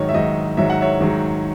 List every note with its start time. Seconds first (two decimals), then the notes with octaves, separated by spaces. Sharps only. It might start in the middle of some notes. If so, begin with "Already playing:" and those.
Already playing: G#2 D#3 F#3 C#5 D#5
0.09 E5
0.14 G#2 D#3 F#3 D#5
0.57 G#2 D#3 F#3 E5
0.70 F#5
0.81 C#5 E5
1.00 G#2 D#3 F#3